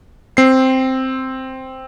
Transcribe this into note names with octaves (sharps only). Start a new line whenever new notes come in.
C4 C7